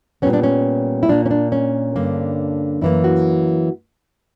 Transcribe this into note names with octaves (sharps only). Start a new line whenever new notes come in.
A#2 G3 B3 C#4
D4
C#4
E4
A#2 A#3 D4
C#4
D4
C#4
G2 D3 A#3
F#2 E3 A#3 E4
F#4